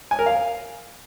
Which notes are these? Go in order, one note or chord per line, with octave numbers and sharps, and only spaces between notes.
G#5
A#4
F5